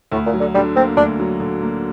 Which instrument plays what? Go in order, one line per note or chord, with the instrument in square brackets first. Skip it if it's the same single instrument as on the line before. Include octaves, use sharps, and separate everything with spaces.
[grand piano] D2 [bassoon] A2
[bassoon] A#2
[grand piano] F#3
[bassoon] D3
[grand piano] D3 [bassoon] G3
[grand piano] A#3 [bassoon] C4
[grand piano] D2 [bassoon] D4
[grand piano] F#3
D3
A#3